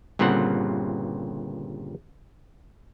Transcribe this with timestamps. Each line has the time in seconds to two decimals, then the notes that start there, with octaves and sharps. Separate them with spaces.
0.19 G1 G2 A#2 C#3 C4 F#5